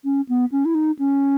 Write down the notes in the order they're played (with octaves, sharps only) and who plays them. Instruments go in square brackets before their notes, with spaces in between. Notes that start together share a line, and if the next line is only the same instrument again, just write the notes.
[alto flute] C#4
B3
C#4
E4
D#4
C#4